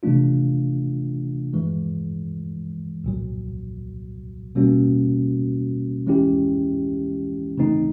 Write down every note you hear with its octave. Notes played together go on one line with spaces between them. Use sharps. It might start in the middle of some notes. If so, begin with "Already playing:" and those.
C3 E3 A3 D4 F4
G2 E3 G#3
C2 A#2 F#3
B2 G3 A#3 C#4 F#4
E3 G#3 C#4 E4 G4
C#3 E3 A3 C4 D#4